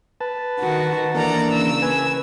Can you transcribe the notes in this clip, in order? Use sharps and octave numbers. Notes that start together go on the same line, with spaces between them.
B4 A5
D#3 F#4
E3 A#3 D4 A4 D5 A#5
C#3 E6
B4 G#5